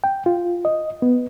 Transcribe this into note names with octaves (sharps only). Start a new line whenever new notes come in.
G5
F4
D#5
B3